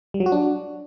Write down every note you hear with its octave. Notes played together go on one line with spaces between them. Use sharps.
G3
F#3
F#4
D4